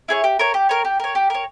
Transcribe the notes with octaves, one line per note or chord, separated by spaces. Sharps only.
E4 G#4 C#5
G4
A#4 C#5
G4
A#4 C#5
G4
A#4 C#5
G4
A#4 C#5